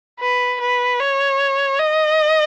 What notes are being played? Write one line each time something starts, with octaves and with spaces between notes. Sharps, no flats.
B4
B4
C#5
D#5